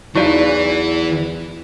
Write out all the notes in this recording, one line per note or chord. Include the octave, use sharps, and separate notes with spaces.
E2 E3 F#3 D#4 E4 F#4 D5 F5